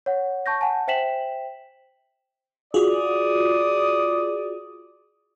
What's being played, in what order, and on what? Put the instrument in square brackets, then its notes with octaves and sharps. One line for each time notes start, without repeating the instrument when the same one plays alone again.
[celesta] C#5 F#5
A5 C#6 G6 A#6
F#5 G#5 A5
C5 E5 G5 B6 E7 F#7
[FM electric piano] F4 F#4 G#4 [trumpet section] D5 D#6